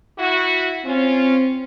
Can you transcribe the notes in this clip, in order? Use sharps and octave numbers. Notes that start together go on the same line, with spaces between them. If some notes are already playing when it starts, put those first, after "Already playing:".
E4 F#4
C4 C#4 F4